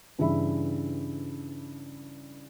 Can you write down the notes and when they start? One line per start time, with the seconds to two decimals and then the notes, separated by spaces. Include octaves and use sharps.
0.19 G2 C#3 E3 E5 B5